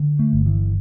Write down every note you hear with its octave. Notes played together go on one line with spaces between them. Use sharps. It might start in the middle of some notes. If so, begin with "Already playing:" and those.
Already playing: D3
A3
G1
E3